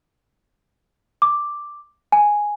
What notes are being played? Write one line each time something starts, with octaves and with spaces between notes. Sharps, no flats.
D6
G#5